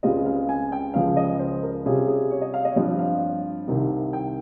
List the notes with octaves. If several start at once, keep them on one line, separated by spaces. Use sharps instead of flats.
C#2 C#3 G#3 C4 F4 D#5
F5
G#5
G5
C#2 C#3 F3 F5
D#5
C5
A#4
C3 G3 C#4 F4 G#4
G#4
C#5
D#5
F5
D#5
C#5
G2 F3 C4 F4 D#5
F5
C2 C3 D#3
G5